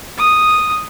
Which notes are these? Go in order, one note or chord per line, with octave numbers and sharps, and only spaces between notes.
D#6